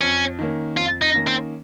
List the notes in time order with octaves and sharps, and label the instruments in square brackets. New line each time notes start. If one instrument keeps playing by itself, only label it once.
[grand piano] F2 [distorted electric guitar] C#4
[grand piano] D#3 A#3 C#4
[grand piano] F2 [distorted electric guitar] F4
[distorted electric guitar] D#4
[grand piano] D#3 A#3 C#4
[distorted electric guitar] C4